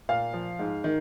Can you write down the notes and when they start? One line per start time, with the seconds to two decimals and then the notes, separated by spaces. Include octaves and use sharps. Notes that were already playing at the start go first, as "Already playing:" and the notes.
0.09 A#2 F5
0.33 F3
0.59 G#2
0.84 D#3